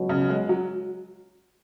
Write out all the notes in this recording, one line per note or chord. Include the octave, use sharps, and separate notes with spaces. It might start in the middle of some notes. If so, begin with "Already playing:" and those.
Already playing: C#2 B2 F#3
C#3
G#3
F#3